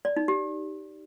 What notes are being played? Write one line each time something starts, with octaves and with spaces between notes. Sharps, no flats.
D5
D#4
G4